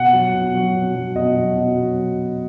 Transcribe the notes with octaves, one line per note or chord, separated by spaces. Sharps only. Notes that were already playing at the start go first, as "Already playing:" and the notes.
Already playing: B2 F#5
F#3
B2
F#3
B2
F#3
B2 D#5
F#3
B2
F#3